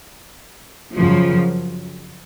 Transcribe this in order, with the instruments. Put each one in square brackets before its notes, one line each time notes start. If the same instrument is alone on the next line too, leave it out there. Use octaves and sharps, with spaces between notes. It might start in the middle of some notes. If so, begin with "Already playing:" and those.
[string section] F#2 C#3 F3